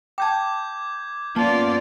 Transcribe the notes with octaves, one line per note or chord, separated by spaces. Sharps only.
G5 A5 D6 G6 G#6
A#3 B3 C#4 F4 D5 A5